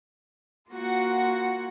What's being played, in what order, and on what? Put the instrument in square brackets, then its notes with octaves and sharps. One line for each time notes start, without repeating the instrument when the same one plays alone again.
[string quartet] A#3 F4 F#4 F#5